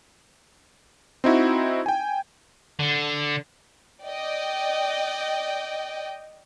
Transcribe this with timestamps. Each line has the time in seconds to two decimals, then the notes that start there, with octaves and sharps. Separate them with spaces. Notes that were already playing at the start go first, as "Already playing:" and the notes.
1.24 C4 D#4 E4 F#4
1.86 G5 G#5
2.79 D3
4.01 D5 D#5 G5